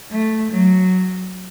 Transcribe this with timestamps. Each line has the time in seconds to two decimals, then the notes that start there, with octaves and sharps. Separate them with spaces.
0.11 A3
0.52 F#3